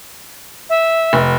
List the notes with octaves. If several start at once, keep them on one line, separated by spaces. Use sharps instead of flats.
E5
F1